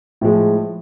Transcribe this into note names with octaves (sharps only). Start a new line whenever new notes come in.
A2 F3 G#3